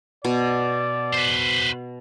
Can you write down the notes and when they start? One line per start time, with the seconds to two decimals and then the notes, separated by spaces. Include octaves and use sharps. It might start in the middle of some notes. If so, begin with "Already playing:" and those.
0.25 B2 D5
1.13 B4 C5